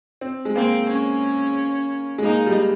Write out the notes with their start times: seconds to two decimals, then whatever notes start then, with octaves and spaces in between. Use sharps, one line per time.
0.21 C4
0.45 G#3
0.56 A#3 C4
0.89 C#4
2.18 G#3
2.23 A#3 D#4
2.46 G3